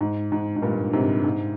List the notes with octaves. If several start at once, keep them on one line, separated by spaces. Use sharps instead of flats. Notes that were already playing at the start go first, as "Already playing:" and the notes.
G#2
G#2
G#2
G2 A#2
G#2 C3
G#2